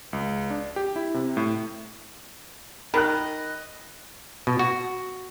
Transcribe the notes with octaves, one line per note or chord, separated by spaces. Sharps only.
C#2
D4
G4
E4
C3
A2
D#3 A#4 D#5 B5 F#6
B2
F#4